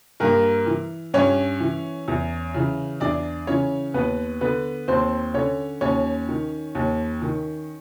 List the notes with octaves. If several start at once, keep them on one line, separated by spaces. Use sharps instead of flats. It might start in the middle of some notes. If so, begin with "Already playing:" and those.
G2 A#3 A#4
E3
G2 C#4 C#5
E3
E2
C#3 E3
E2 D4 D5
C#3 E3 C#4 C#5
D#2 B3 B4
D3 B3 B4
D#2 C4 C5
D3 C#4 C#5
D#2 C#4 C#5
D#3
D#2
D#3